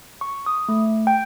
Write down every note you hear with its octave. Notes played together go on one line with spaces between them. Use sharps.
C#6
D#6
A3
G5